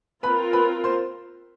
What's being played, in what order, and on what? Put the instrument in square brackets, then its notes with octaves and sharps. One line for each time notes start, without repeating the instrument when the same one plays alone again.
[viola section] C4 F4 A#4 [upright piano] B4 B5
[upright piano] B4 B5
C5 C6